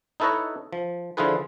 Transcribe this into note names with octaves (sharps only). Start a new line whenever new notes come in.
D#4 E4 A4 B4 C#5 D#5
F3
D3 F3 E4 F4 G#4 B4